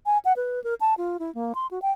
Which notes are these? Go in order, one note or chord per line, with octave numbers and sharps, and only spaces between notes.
G#5
F#5
B4
A#4
A5
F4
E4
A#3
C6
F#4
G5